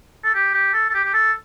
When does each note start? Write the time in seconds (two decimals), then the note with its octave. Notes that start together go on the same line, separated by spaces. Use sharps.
0.24 A4
0.35 G4
0.54 G4
0.74 A4
0.90 A4
0.94 G4
1.05 G4
1.14 A4